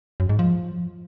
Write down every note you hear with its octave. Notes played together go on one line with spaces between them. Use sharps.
F#2
G#2
F3